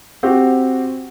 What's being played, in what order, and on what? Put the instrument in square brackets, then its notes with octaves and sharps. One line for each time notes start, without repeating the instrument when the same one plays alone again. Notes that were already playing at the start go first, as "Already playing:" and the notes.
[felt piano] C4 F#4 G4